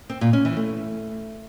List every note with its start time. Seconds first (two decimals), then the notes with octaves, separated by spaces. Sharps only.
0.10 C4
0.21 A#2
0.33 C#4
0.45 E3
0.57 A3